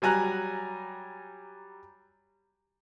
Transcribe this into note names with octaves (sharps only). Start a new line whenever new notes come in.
F#3 G3 G#5 A#5 F#6